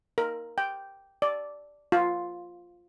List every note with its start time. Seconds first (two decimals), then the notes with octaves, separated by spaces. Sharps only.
0.18 A#4
0.58 G5
1.22 D5
1.92 F4